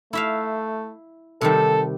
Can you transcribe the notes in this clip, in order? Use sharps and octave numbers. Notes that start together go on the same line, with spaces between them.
A3 E4 E5 F5
C3 D#3 G3 A4